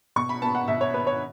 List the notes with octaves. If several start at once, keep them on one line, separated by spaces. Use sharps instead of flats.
B2 C#6
B5
B3 A5
F#5
B2 E5
C#5
B3 B4
C#5